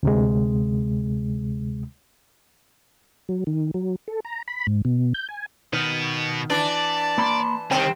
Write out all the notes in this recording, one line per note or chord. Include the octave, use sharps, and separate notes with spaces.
D2 C3 G#3
F#3
D#3
F#3
A4
A#5
B5
G#2
B2
G6
G#5
B2 D#3 B3
E3 D4 D5 A5
A#3 B5 C6
C2 C3 D#3 C4 G5